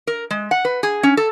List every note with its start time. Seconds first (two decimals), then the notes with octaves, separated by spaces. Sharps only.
0.07 A#4
0.31 G#3
0.51 F#5
0.65 B4
0.83 G#4
1.03 C#4
1.17 A4